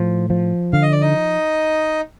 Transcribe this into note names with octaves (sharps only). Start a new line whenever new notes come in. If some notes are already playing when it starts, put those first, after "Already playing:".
Already playing: A2 F3
F3
D3 F5
D#5
D5
D#4 D#5